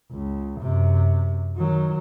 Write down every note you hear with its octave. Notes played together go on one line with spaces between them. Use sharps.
C#2
F#2 C3
D#3 F#3